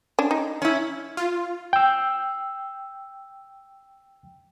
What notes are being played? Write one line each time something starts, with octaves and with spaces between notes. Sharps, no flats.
C#4 D4
D#4
C#4 E4
F4
G5 E6